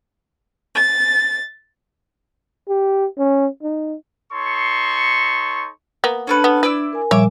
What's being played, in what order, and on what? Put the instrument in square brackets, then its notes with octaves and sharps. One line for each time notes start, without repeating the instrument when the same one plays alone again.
[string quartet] A6
[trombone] G4
C#4
D#4
[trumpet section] D#4 A4 C#5 C6 C#6
[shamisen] A#3 B3
[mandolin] C#4 A4 B4 [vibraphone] D4
[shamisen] B3
[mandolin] E4 D5 E6 [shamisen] B4
[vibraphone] A#4 G#5
[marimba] A#2 F3 G3 [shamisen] C#5 [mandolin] E5 D6